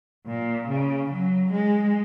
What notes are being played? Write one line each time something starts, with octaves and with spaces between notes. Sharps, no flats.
A#2
C#3
F#3
G#3